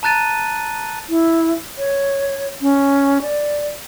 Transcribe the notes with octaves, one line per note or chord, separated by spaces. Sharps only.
A5 A#5 F#6 A6 D#7
E4
C#5
C#4
D5